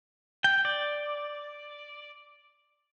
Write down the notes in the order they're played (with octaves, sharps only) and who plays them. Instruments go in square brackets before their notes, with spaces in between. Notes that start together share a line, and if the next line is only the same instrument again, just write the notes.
[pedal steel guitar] G5
D5